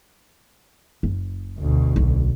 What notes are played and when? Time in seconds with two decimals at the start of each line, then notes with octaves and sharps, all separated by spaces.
1.03 F#1
1.58 D2 B2
1.96 B1